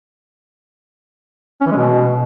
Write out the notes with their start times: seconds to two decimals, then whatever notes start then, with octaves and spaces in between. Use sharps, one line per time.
1.61 C#4
1.66 E3
1.71 G#3
1.76 B2